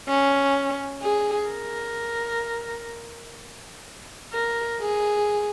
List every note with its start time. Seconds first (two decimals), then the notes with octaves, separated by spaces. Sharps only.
0.08 C#4
1.02 G#4
1.49 A#4
4.33 A#4
4.80 G#4